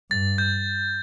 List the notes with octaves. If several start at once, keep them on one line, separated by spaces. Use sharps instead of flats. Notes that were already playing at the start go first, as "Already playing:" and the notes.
G2 A6
G6